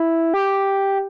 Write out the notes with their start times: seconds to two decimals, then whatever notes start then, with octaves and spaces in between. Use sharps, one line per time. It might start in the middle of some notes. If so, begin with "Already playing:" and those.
Already playing: E4
0.34 G4